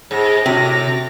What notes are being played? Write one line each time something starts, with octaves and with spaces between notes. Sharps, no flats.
G#2 G#4 A#6
A2 C3 F#4